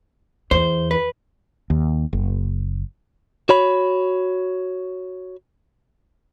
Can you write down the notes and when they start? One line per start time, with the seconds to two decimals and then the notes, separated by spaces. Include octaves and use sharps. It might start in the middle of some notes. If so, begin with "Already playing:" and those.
0.51 E2 C5
0.91 B4
1.70 D#2
2.13 F#1
3.49 F#4 C#5 B5